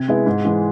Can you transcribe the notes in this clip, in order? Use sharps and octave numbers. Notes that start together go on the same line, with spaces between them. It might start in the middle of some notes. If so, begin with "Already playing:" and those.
Already playing: C3 G#6
G#3 B3 E4
G#2
E3 G#3